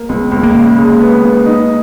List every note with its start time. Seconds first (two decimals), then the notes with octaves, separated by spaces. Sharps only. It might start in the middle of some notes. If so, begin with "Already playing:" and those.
Already playing: A#3
0.09 C#2 B3
0.31 C#2
0.43 A#3
0.55 C#3
0.78 G#3
1.00 B3
1.23 B3
1.46 D#4